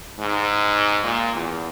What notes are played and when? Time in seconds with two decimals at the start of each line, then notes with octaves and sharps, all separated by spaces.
0.19 G#2
1.04 A#2
1.35 E2